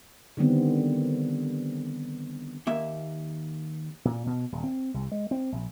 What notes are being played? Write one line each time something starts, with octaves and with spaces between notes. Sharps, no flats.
D3 D#3 G3 B3 C4
D#2 A#3 E5
A#2
B2
D#1
C4
C2
G#3
C4
A#1